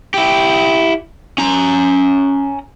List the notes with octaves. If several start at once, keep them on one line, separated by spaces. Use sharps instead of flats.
E4 G4
C#4 A#5